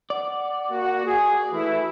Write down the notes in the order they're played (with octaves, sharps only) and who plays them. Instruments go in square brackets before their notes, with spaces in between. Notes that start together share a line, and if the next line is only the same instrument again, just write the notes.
[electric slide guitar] D5 [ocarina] F#5
[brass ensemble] A#3 F#4
[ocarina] F#4 [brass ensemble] G#4
[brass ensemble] E3 A3 E4